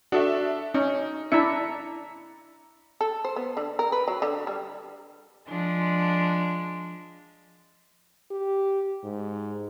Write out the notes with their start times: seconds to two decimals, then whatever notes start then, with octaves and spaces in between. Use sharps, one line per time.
0.12 D4 F#4 A4 E5
0.74 C#4 D#4
1.32 D4 E4 E5 A#5 C#7
3.01 A4
3.24 C5
3.36 B3
3.57 D3
3.79 A#4
3.92 B4
4.08 F#3
4.22 D3
4.47 G3
5.47 F3 G#3 D4
8.31 G4
9.04 G#2